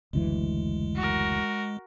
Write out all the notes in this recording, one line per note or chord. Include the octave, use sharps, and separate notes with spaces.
F#1 D2 E3 G#3
F#4 A#4